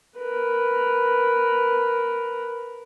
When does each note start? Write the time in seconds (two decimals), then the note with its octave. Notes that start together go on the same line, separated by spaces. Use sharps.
0.19 A#4 B4